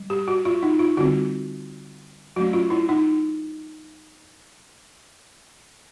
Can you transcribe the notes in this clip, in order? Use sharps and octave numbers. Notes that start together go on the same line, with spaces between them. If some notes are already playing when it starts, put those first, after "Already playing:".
Already playing: G3
G4
F#4
F4
D#4
F4
D3 G3 C4 F#4
F#3 A3 C#4 F#4
F4
E4
D#4